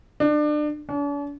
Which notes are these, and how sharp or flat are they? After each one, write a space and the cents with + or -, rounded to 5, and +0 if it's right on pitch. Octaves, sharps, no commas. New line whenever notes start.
D4 +30
D4 -45